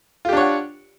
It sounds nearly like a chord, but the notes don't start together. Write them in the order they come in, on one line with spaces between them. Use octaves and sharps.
F4 G4 D4 C#5 F#5